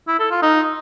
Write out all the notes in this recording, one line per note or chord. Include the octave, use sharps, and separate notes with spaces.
E4
A4
F4
D#4